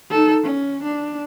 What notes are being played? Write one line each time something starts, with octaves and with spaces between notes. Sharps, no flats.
D#4 A4
C#4
D4